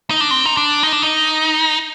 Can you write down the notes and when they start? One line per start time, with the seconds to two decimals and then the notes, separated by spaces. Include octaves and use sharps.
0.10 D#4
0.21 D4
0.31 C4
0.46 D#4
0.57 D4
0.83 D#4
0.92 D4
1.03 D#4